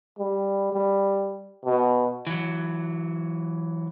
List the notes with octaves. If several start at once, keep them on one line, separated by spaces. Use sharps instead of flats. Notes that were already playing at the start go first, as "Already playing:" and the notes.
G3
G3
B2
E3 F#3